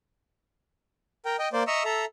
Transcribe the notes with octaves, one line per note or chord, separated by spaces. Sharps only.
A#4 G5
D#5 G5
A#3 C5 D5
D#5 E5 A#5 C#6 E6
A4 E5 A#5